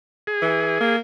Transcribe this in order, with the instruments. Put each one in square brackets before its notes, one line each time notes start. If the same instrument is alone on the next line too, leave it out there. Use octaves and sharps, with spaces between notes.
[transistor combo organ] G#4
[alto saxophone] E3
A#3